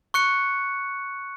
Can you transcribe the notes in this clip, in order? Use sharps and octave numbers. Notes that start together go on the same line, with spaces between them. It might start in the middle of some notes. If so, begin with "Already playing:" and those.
C#6 F#6 C#7